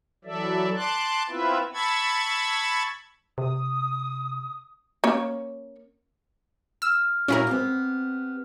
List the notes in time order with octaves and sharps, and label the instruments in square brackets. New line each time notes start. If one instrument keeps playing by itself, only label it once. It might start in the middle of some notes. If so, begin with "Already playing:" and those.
[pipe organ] E3 F#3 A4 D5 E5
A5 C6 D6 F#6
B3 C4 E4 F4 B4 E5
A5 B5 C#6 E6 G#6 A6
[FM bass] C3 [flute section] D#6
[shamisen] A#3 C#4 C#5
[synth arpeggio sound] E6 [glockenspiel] F6
[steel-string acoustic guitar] A#2 F#4 G#5 [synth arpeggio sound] C#4 E4 A#4
[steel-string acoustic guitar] B3 C4 G4